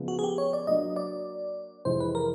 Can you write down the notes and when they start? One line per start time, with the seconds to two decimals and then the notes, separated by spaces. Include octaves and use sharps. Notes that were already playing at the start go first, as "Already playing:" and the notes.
Already playing: C#3 F3 G#3 B3
0.08 F#4
0.19 G#4
0.24 G4
0.38 C#5
0.53 D5
0.67 F#3 A#3 D4 F#4 D#5
0.96 D5
1.85 F2 C3 E3 G#3 C4 C5
2.00 B4
2.15 A#4